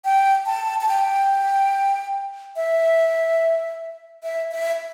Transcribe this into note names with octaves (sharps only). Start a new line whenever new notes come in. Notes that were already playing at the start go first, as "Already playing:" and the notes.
G5
A5
A5
G5
E5
E5
E5